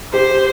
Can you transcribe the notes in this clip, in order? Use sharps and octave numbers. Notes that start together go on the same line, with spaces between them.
G4 C5